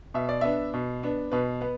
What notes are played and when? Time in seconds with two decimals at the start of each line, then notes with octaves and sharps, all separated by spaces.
0.14 B2 E5
0.29 D5
0.41 B3 D4 E5
0.74 B2
1.03 B3 D4
1.32 B2 B4
1.61 B3 B4